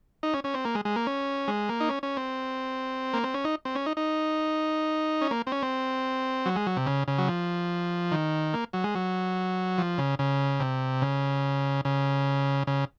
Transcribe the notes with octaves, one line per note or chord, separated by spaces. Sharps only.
D#4
C#4
C#4
C4
A#3
G#3
G#3
A#3
C#4
G#3
A#3
D#4
C#4
C#4
C4
A#3
C4
C#4
D#4
C4
C#4
D#4
D#4
C#4
A#3
C4
C#4
C4
F#3
G#3
F#3
C3
C#3
C#3
F#3
F3
D#3
A#3
F#3
G#3
F#3
F3
C#3
C#3
C3
C#3
C#3
C#3